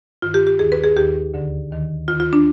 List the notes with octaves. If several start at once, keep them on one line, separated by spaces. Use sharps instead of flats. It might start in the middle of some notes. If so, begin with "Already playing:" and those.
G2 D#3 F4
G4
G4
D#2 D#3 G#4
B4
G#4
D#2 D#3 G4
D2 D3
D#2 D#3
D#2 D#3 F4
F4
D4